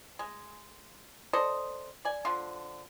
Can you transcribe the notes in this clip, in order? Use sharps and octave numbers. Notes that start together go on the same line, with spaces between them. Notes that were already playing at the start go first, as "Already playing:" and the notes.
G#3
A4 C5 D5 D#5
D5 G#5
D3 F3 C6